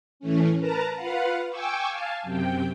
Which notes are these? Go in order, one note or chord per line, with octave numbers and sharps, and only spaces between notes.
A2 E3 A3 C#4
A#4 B4 A5 A#5
F4 B4 F5 F#5
G5 G#5 C#6 D6 E6
F5 G#5 A5
F#2 C3 G5